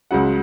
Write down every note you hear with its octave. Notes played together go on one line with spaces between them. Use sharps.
C#2 C#3 F#3 F#5